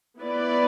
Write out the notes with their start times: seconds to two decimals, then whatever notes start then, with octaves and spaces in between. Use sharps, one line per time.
0.19 B3 E4 B4 D5